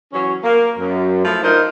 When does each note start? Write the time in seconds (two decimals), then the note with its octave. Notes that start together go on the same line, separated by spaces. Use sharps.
0.13 E3 F#3 C#4
0.43 A#3
0.79 F#2
1.24 F3 A3 E4
1.42 D4 D#4 F4 A#4 C5